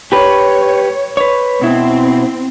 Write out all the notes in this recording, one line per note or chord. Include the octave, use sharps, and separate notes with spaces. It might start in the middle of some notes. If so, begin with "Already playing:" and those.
G4 B4 C#5
B4 C#5
B2 C4 E4